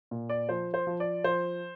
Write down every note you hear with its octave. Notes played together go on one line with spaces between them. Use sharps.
A#2
D5
F3 C5
C5
F3
D5
F3 C5